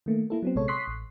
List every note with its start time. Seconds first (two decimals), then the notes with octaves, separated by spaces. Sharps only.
0.06 D#3 A3 A#3
0.30 A#3 E4 A4
0.42 F#3 B3 C4
0.55 A#1 C3 G#3 A4 C#5
0.68 C6 C#6 D#6 F#6 B6 C7
0.88 A1